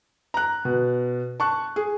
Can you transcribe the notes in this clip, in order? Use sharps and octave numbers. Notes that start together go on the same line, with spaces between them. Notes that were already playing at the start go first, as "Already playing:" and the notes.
A#5 F#6
B2
A5 C#6 F#6
G#4